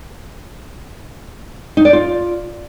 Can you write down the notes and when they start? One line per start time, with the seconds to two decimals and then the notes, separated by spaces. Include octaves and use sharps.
1.77 D#4
1.85 D5
1.93 F4